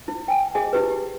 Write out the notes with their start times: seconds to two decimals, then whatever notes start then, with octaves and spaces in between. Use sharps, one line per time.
0.08 E4
0.28 G5 G#5
0.55 G#4 D#5 G#5
0.73 E4 G4 B4
0.91 G4